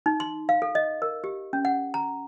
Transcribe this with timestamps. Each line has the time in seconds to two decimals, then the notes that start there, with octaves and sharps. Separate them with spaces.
0.06 D#4
0.20 C6
0.49 F5
0.62 A4
0.75 D#5
1.02 A#4
1.24 G4
1.53 C#4
1.65 F#5
1.94 A#5